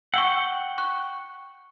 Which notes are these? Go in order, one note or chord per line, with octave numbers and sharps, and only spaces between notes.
F#5 G5 C#6 E6
C#6 F#6